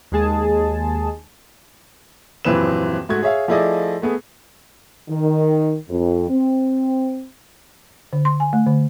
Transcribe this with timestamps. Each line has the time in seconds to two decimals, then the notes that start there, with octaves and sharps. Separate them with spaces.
0.12 D#2 G#3 G#4 A5
2.45 D#1 F#2 E3 C4 B4 E7
3.09 G#2 A3 F#4 G#6
3.23 G#4 C#5 E5 F5
3.48 F3 A3 E4 G#4 D5 D#5
4.02 A3 B3 G#4
5.09 D#3
5.89 F2
6.29 C4
8.13 D3
8.25 C6
8.40 G#5
8.53 A3
8.67 D3